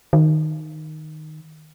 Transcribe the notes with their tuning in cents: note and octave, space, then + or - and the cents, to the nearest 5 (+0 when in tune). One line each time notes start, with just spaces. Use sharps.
D#3 -5